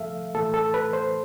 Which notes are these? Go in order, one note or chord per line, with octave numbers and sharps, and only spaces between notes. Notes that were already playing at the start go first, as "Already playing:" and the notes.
Already playing: G2 F3 A3 A4 E5 F5
A2 E3 A3 A4
A4
B4
C5